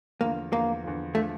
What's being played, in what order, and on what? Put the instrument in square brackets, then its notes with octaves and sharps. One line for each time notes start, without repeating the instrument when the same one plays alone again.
[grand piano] E2 D3 F3 [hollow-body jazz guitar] A#3
[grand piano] E2 D3 F3 [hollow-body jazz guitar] A#3
[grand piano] E2 D3 F3
[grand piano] D3 F3 [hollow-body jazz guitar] A3